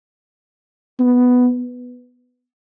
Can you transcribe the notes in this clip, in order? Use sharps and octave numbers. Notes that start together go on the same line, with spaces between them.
B3